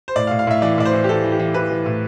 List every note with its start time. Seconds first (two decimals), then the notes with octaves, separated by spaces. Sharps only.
0.08 C5
0.16 A2 D5
0.27 F5
0.31 A2
0.39 F5
0.47 A2 E5
0.62 E3 D5
0.78 A2 D5
0.85 C5
0.93 E3
1.04 G4
1.09 E3 A4
1.24 E3
1.32 G4
1.39 E3
1.54 E3 B4
1.71 E3
1.86 A2